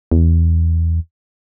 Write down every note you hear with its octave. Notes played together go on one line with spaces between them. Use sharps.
E2